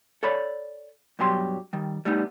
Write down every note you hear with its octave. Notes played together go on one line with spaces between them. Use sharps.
A4 C#5 D5 B5
G2 B2 F#3 G4 C6
D#3 G3
G3 A3 B3 D#4